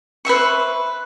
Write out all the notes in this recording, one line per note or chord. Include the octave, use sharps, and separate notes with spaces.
B4 C5 E5 C#6